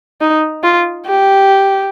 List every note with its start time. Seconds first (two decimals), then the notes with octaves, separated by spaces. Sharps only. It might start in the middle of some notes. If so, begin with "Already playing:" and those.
0.21 D#4
0.64 F4
1.06 G4